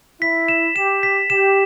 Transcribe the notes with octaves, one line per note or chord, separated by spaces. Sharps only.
E4 B6
E7
G4 E7
B6
G4 E7